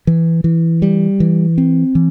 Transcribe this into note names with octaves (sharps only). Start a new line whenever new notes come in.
E3
E3
G3
E3
C4
E3